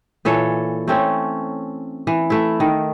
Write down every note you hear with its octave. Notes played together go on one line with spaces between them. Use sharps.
A#2 E3 A4 C#5
A3 C4 C#4
E3
A3 E4
D#3